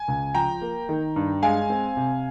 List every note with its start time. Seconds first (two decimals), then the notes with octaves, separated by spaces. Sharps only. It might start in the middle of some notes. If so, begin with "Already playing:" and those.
Already playing: G#5
0.08 C#2
0.35 F3 G5 A#5
0.61 A#3
0.89 D#3
1.16 G2
1.42 G#3 F5 G#5
1.70 C4
1.97 C3